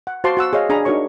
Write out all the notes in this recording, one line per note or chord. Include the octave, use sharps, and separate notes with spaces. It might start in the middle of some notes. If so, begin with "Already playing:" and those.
F#5
F#4 C5 F5 A5 C6 D6
F#4 F#5 E6
G#4 C#5 D#5 F5
D4 G#4 A#5 B5
D4 D#4 F#4 A#4 C#5 C#6